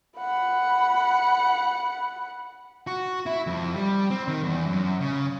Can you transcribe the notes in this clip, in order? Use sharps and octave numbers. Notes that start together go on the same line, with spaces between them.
F#5 B5
F#4
E4
F2
G3
C4
D#3
E2
F#2
C#3